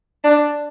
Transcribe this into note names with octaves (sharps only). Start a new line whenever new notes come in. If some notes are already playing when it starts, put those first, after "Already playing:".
D4